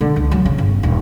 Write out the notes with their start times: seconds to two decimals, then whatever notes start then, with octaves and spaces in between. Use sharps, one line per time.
0.01 D3
0.16 C#2
0.31 F#3
0.45 C#3
0.58 G1
0.83 D#1